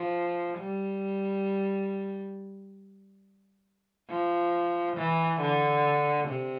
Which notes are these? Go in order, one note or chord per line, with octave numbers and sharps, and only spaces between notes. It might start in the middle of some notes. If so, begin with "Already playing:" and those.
Already playing: F3
G3
F3
E3
D3
C3